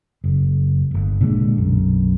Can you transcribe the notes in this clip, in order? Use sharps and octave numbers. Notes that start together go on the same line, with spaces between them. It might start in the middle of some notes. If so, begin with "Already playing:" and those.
F#1
D1 G1
A#2 D3 F#3 G#3
B1 F#2